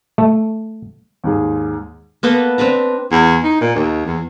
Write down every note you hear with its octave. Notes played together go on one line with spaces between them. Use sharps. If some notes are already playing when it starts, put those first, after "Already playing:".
A3
D#2 G#2 G#4
A#3 B3 A4 B4
C4 D4 B4 A#5
E2
D#4
A#2
D#2
E2